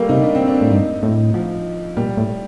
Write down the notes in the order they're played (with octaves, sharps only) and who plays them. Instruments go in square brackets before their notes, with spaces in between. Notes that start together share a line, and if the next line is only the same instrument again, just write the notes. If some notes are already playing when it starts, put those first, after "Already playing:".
Already playing: [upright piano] G3 A3 A#3
[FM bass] C3 [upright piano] D#4
[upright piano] D4
C4
D4
[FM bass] A2
[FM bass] G2 [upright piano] D#4
[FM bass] A2
[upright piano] F3
[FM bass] A#2 [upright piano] G3
[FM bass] A2